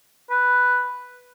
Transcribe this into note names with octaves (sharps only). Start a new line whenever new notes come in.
B4